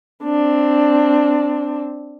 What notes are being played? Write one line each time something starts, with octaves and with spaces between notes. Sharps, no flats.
C4 D4